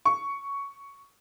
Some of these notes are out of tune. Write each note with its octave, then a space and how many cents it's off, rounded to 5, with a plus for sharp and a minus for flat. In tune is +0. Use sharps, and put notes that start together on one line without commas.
C#6 +5